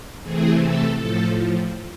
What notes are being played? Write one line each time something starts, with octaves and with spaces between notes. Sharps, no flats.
C3 E3 A3 C4 G#4
A4
A2 F3 A4